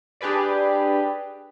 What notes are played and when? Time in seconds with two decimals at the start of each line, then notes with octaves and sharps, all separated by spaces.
0.21 D4 G4 G#4 B4 D5